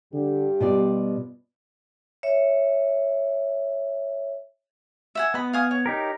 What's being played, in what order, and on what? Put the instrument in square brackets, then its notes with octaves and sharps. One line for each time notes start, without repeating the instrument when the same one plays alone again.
[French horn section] G2 G4 [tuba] D3
[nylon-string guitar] B2 F4 D5 [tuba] G3
[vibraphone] C#5 E5
[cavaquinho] E5 F#5 G#5
[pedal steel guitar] B3 [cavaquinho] D#5 B5
[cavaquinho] F5 G#5 D#6
C#5
[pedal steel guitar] D#4 G4 A#4